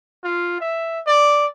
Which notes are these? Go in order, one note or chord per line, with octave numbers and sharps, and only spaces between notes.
F4
E5
D5